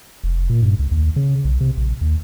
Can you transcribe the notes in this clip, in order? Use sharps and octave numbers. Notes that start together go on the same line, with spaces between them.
F1
A#2
G2
C#2
D#2
C#3
B1
C3
A#1
D#2